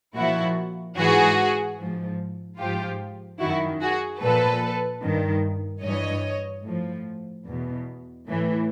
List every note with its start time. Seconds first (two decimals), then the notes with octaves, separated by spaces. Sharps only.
0.16 A#2 F3 E4 F#4
0.98 G#2 E3 F#4 G#4
1.79 G#2 F3
2.59 G#2 F3 F4 G4
3.40 F#2 D#3 E4 F#4
3.82 F#4 G#4
4.22 A#2 F3 A4 B4
5.03 G2 D#3
5.84 G2 E3 C#5 D#5
6.65 A2 F3
7.47 E2 B2
8.27 A2 E3